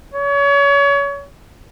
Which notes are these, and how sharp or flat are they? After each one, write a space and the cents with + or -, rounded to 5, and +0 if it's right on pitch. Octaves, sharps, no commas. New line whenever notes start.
C#5 +30